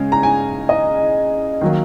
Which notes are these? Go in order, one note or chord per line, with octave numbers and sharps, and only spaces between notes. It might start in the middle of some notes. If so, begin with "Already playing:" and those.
Already playing: C#3 G#3 C#4
A#5
G#5
D#5
D#3 F#3 A#3